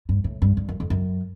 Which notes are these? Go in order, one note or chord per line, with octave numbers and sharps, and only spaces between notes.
G2
A2
G2
G2
F#2
F2
F#2